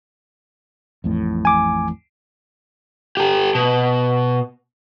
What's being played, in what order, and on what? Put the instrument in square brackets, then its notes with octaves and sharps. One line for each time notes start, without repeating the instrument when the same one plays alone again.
[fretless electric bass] A1 F2 A2
[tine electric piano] G#5 D6
[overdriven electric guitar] G4 A4
B2